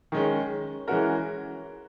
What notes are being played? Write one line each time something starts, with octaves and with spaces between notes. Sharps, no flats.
D#3 G#3 C#4
E3 G#3 C#4 F#4 A#4